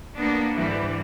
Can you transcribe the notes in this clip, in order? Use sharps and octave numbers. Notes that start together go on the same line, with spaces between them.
A#3 B3 D4
G#2 D3 E3 G3